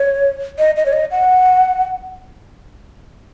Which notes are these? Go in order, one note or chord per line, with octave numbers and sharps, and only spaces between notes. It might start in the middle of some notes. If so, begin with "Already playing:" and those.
Already playing: C#5
D#5
D#5
C#5
D#5
F#5